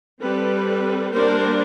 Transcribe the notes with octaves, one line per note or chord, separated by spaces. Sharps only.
G3 C4 A4 B4
G3 A#3 D4 A#4 C5